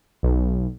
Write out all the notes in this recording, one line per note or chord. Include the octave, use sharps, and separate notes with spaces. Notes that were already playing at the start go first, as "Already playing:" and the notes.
B1